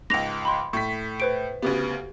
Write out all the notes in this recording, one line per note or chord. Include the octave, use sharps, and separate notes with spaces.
C#2 G#2 A#6 F7
B5 C6
A2 C#6 B6
B4 C5 D7
D2 C#3 B3 G4